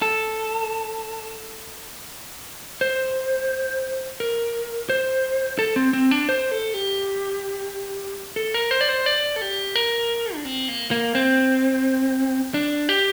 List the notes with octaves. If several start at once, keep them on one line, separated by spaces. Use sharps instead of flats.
A4
C5
A#4
C5
A4
C4
C4
D4
C5
A4
G4
A4
A#4
C5
D5
C5
D5
A4
G4
A#4
D4
C4
A#3
A#3
C4
D4
G4